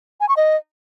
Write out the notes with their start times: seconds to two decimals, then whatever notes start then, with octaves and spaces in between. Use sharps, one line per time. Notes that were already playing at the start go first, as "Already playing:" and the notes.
0.20 G#5
0.29 C#6
0.37 D#5